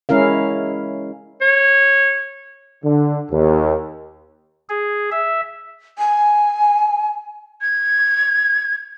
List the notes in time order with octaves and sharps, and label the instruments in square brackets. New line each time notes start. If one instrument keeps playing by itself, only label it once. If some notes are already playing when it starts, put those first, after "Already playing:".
[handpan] G#3 C#4 E4 A#4 F5
[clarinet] C#5
[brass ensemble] D3
D#2
[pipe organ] G#4
E5
[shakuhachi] G#5
[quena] G#6